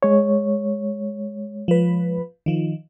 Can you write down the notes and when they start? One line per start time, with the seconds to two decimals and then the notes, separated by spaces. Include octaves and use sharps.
0.03 G#3 C#5
1.68 F3 B4
2.46 D#3 F3